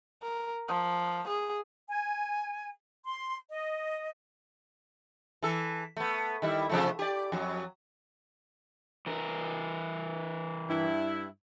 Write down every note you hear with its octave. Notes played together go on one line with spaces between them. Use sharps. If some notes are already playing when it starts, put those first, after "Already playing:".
A#4
F3
G#4
G#5
C6
D#5
E3 A4
A3 B3
D#3 G3 E4
C3 F3 A3
G4 D5
F2 F#3
E3 A#4
G2 E4